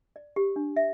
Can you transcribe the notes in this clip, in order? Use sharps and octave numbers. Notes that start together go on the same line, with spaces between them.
D5
G4
D4
E5